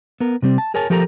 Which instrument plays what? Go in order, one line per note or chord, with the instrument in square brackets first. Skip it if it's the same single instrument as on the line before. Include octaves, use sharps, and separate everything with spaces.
[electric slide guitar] B3 A#4
C3 G3 C4
A5
G#4 A#4 C#5 G#5 A5
F3 G4 A4 A#4 A5 A#5